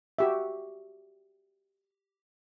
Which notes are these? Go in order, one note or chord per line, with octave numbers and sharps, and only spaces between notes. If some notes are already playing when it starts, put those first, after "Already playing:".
F#4 G4 E5